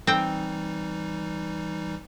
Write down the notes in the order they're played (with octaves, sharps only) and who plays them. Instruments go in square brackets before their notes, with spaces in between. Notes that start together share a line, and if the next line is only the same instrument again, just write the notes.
[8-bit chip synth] E3 G3 D#4 [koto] C4 G5